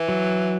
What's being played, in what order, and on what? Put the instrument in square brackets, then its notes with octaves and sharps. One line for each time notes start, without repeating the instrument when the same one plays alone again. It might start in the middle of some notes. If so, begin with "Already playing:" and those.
Already playing: [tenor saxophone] E3
[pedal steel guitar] F#3